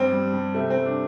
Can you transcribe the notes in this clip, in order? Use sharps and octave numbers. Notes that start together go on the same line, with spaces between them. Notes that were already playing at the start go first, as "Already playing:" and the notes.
Already playing: G2 G3 C4
G3
G3
C3 A3
G3 C4
D4